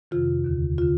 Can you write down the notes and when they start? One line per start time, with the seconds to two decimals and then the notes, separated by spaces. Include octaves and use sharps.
0.11 F2 C3 D#3 F4
0.44 D#2 D3
0.78 D3 F4